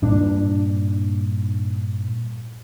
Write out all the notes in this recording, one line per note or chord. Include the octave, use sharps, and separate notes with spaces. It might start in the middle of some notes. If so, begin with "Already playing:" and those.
G2 A#2 D4